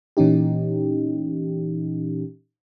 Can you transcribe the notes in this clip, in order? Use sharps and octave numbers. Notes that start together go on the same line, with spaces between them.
A#2 E3 C#4 D#4 G4